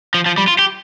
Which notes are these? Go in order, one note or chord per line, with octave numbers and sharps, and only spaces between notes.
F3
F3
G3
F4
G4